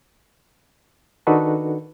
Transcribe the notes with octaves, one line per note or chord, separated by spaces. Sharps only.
D#3 D4 D#4 F#4 A4 B4